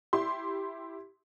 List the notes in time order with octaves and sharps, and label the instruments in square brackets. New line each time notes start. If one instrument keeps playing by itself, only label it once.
[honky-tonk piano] E4 G4 C6